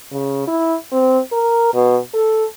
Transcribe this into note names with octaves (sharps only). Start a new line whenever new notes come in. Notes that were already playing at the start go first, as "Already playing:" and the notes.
C#3
E4
C4
A#4
B2
A4